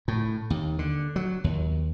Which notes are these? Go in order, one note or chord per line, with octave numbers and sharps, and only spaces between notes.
A2
D#2
D3
F#3
D#2